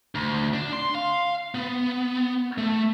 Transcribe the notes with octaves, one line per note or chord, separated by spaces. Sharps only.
D2
D4
C6
F5
B3
A3